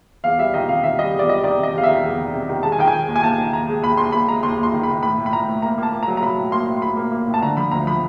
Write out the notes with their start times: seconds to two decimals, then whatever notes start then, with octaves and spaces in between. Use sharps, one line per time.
0.24 E2 F5
0.39 G3 E5
0.54 D#3 D#5
0.68 C3 F5
0.83 D#3 E5
0.99 G3 D#5
1.14 E2
1.19 D5
1.28 G3 D#5
1.43 D#3 D5
1.58 C3
1.63 D#5
1.74 E2 F5
1.83 E5
1.89 D#3
2.03 E2
2.18 D#3
2.34 C3
2.49 D#3
2.63 G#3 A5
2.72 G#5
2.78 D#3 G5
2.88 G#5
2.93 G#3
3.08 D#2
3.16 G#5
3.23 D#2 A5
3.38 D#3
3.53 D#2 A#5
3.68 G#3
3.83 D#2 B5
3.97 D#2 C6
4.12 D#2 B5
4.28 G#3 A#5
4.43 D#2 C6
4.58 D#2
4.63 C6
4.73 D#3
4.83 D#3 B5
5.03 A2 B5
5.18 A2
5.26 B5
5.32 A2 A#5
5.48 A2
5.62 A#3 A#5
5.78 A#3 A5
5.93 A#3
6.03 A#5
6.08 F#3
6.17 A#5
6.23 F#3 B5
6.37 A2
6.52 A#3 C6
6.67 A2
6.77 C6
6.82 A2 B5
6.97 A#3
7.12 A#3
7.27 A2
7.34 A5
7.42 D3 A#5
7.57 F3 B5
7.71 D2 A#5
7.87 F3 B5